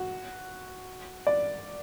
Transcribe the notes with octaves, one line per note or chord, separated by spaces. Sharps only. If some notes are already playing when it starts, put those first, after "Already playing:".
Already playing: F#4
D5